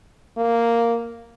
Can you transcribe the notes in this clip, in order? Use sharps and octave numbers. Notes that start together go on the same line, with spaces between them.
A#3